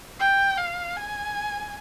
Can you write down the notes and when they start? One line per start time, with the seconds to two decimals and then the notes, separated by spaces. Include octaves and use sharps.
0.19 G5
0.58 F5
0.97 G#5